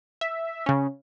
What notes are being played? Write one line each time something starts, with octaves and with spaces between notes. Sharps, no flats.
E5
C#3 C#4